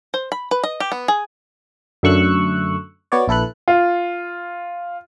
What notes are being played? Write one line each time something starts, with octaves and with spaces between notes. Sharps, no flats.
C5
B5
B4
D#5
G4
B3
G#4
F#2 D3 A3 C#6 E6 F#6
B3 F#4 C#5 D5
A#1 E4 A4 B4 F#6
F4